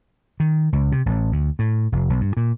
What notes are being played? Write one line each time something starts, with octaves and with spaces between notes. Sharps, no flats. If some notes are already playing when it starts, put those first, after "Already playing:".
D#3
C#2
C3
A1
D2
A2
F1
B1
G2
A#2